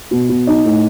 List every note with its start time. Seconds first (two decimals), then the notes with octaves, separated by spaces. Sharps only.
0.11 B2
0.29 B2
0.47 D#4
0.65 A2